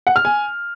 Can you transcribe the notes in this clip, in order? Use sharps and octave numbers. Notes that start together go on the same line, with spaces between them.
F#5
F6
G#5